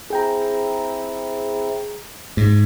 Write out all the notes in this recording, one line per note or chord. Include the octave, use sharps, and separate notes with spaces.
C4 E4 G#4 G5 A#5
G#2